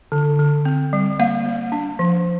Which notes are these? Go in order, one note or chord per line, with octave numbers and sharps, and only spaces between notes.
D3
D3
C4
G3
A#3 F5
A#3
D4
F3